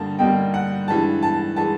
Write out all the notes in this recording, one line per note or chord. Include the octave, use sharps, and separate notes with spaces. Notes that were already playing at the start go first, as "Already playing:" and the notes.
Already playing: G2 D3 G3 A#3 D#4 A5
G2 D3 G3 A#3 D#4 G5
F#5
G2 E3 G#3 A5
A5
E3 G#3 A5